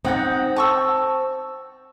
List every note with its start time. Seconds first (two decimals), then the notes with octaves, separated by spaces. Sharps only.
0.05 C4 D#4 F#5 G6
0.57 A5 C#6 E6